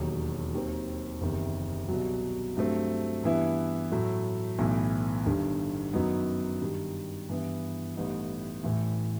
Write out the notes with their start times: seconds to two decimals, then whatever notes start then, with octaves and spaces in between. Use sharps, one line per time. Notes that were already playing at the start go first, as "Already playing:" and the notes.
Already playing: E1 D#2 D#3 F#3
0.54 D#2 D#3 F#3 C4
1.21 F#1 E2 C3 D#3
1.89 C2 B2 F#3
2.57 G2 F#3 A3 C4
3.24 G2 E3 B3 E4
3.92 A2 F#3 A3
4.58 B1 A2 E3 B3
5.26 G1 G2 D#3
5.93 F#2 D#3 F#3 B3 D#4
6.61 G2 D#3 G3
7.29 G2 E3 B3 E4
7.96 A1 A2 G3 B3 D#4
8.64 A1 A2 E3